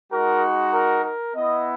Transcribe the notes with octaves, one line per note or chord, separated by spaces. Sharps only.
G#3 D#4 F#4 A#4
A#4
A#4
B3 E4 D#5